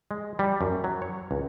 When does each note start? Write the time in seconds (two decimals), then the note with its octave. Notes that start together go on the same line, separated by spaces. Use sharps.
0.11 G#3
0.39 G3
0.61 F#2
0.84 F#3
1.02 C#5
1.31 C#2